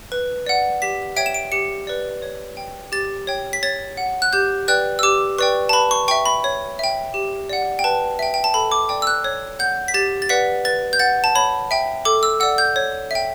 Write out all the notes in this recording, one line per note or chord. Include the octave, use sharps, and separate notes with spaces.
B4
D5 F#5
G4 B6
C#5 E5 G5 D7
E7
D7
G4 C#7
B4 D5
C#5
G5
G4 A6
C#5 G5
B6
C#5 A6
F#5
F#6
G4 G6
B4 D5 G5 F#6
E6
G4 D6
B4 D5 G5 C#6
A5
B4 B5
C#6
E5 G5 C#6
B5
C#5
E5 G5
G4
D5 F#5
G5
B4 A5
E5 G5
G5
A5
A4 B5
D6
D5 G5
E6
F#6
C#5
F#5 G6
B6
G4 A6
A6
B4 D5 F#5 B6
B4 A6
G6
F#5 A6
A5
C#5 B5
E5 G5
A4 D6
E6
D5 F#5 E6
G6
C#5
E5 G5